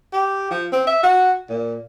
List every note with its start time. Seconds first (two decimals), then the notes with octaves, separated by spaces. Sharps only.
0.13 G4
0.51 F3
0.72 C4
0.87 E5
1.03 F#4
1.49 A#2